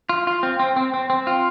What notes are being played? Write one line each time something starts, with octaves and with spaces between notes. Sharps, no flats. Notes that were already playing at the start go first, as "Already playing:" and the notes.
F4
F4
C4
C4
C4
C4
C4
F4